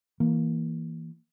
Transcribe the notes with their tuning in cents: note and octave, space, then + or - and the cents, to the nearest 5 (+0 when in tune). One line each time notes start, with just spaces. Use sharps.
E3 -10 A#3 +0